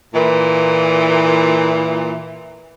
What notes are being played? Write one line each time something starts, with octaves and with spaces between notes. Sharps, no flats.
A#2 E3